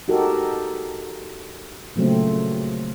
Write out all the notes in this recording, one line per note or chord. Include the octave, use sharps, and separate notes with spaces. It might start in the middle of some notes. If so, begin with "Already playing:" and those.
D#4 F#4 G4 A4 A#4
A#2 C#3 F3 F#3 A3 C4